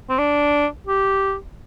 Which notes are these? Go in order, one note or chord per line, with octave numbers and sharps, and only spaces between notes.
C4
D4
G4